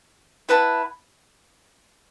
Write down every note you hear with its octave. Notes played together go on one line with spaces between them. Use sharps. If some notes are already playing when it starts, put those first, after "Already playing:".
E4 B4 F#5 A5